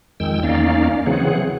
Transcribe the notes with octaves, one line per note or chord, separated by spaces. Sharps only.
F2 D#3 G#3 G5 E6
E2 A#3 C#4 D#4 D5 F5
C#3 E3 F#3 C4 G#4 F#5